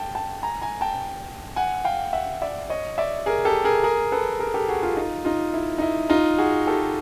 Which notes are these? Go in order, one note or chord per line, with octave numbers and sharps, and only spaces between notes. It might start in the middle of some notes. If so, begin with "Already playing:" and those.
Already playing: G5 A5
G5 A5
G#5 A#5
G#5 A#5
G5 A5
F#5 G#5
F5 G5
E5 F#5
D5 E5
C#5 D#5
D5 E5
G#4 A#4
G4 A4
G#4 A#4
G#4 A#4
A4 B4
G#4 A#4
G4 A4
F#4 G#4
F4 G4
D#4 F4
D#4 F4
E4
D#4
E4
D#4 F4
F#4 G#4
G4 A4